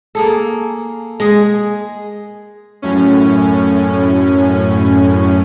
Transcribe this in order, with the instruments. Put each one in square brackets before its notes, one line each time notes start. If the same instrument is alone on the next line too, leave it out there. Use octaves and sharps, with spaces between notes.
[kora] A#3 G#4 A4
G#3 G#4
[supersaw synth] F#2 A2 C#4